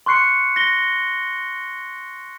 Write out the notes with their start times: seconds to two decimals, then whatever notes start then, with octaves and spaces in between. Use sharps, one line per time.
0.06 C6 C#6 F#6 C7 C#7
0.56 A#6 G7